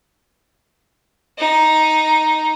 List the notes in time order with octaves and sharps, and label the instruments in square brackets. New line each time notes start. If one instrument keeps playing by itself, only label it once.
[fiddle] D#4